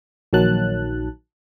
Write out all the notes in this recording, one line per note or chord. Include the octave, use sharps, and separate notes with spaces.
A#1 D#3 F#3 A5 F#6